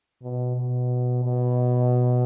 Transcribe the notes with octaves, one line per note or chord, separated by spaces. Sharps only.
B2
B2
B2